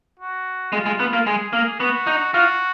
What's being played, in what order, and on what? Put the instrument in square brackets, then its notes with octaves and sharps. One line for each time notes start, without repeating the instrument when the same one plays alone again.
[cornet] F#4
[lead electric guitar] G#3 [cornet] F4
[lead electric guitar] G#3
B3
A#3
[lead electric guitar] G#3 [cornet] G#4
[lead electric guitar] A#3
[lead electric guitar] B3 [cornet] F#4
[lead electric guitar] D#4
[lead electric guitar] F4 [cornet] F#4